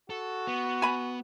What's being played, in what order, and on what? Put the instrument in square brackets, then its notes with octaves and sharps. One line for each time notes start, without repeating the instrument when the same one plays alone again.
[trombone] F#4 [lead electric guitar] A4
[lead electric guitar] B3
[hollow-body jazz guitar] G#5 B5